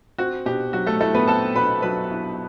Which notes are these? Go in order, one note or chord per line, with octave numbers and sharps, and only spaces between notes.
C4 F#4
B2 G4
F#3 F#4
A3 A4
A3 E4 A4
B3 B4
C4 A4 A5
B2 B4 B5
F#3 B4 B5
E4